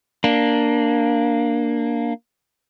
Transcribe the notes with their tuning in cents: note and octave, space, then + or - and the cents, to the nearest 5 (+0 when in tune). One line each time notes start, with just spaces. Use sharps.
A#3 +0 D4 +0